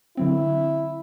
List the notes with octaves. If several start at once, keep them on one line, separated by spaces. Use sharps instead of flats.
D3 F#3 C4 E4